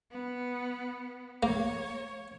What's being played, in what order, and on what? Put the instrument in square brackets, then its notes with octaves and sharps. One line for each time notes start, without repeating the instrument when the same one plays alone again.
[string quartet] B3
[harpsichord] A#3 [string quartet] C#5